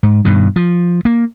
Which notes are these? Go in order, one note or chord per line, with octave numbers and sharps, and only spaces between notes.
G#2
G2 B2 D#3
F3
A#3